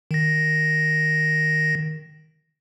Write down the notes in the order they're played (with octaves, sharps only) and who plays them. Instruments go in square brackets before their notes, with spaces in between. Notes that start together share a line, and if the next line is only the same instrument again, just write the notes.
[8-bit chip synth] D#3 A#6